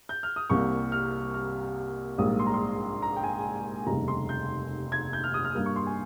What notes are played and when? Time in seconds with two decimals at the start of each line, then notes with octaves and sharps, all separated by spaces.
0.09 G6
0.23 F6
0.36 D#6
0.50 C2 C3 G3 A#3 C#6
0.92 F6
1.34 F6
2.18 A#1 G#2 G3 A#3 D#6
2.39 C6
2.47 A#5
2.54 C6
3.02 A#5
3.16 G5
3.24 G#5
3.87 F1 D#2 C#3 G3 A#5
4.08 C6
4.29 G6
4.92 G#6
5.13 G6
5.24 F6
5.34 D#6
5.45 F6
5.55 G2 G3 A#3 F6
5.66 C#6
5.76 C6
5.87 G#5